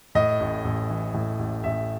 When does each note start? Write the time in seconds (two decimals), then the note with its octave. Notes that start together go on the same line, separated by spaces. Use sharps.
0.15 A2 D#5
0.40 A1
0.65 A1
0.90 E3
1.14 A2
1.39 A1
1.64 A1 E5